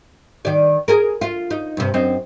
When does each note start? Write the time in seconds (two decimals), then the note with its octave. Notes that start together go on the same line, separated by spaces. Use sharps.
0.45 D#3 D5
0.88 G#4 A#4
1.21 F4
1.51 D#4
1.77 G2 C3
1.94 F#2 C4 D#4